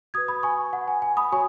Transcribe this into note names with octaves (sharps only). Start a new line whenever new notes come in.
F#4 B4 D#6 G#6
B5 D#6
G#5 C#6
F#5
G#5
G#5
B5 D#6
F#4 C#5 G#5 C#6